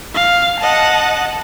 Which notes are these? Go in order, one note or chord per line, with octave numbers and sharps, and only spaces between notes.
F5
D#5 F#5 A5